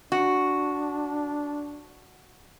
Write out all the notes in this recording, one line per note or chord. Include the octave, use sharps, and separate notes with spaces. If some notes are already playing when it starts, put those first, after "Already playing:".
D4 F#4